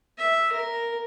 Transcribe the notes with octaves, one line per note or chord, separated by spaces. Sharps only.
E5
A#4